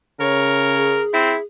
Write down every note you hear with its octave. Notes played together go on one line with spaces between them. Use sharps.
C#3 A#4 C#5
G#4
C4 E4